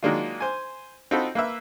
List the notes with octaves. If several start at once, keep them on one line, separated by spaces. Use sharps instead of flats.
D#3 F#3 G#3 A#3 D4 F4
C5 G#5
C4 D#4 F4 F#4 A4 B5
A#3 B4 E5